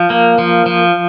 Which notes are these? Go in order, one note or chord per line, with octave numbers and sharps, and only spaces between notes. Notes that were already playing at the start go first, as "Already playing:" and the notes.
Already playing: F3
A#3
F3
F3